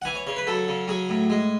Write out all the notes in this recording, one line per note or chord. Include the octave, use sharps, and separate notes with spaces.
F#5
E3 G#5
C#5
C#3 C#5
B4
F#3 A4
C#3
F#3 G#4
A2
G#3